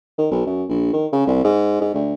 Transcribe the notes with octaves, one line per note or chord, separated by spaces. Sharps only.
D#3
B1
F#2
A#1
D#3
C#3
C2
G#2
G#2
D2